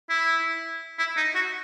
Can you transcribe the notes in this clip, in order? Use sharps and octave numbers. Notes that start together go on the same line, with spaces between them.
E4
E4
D#4
F#4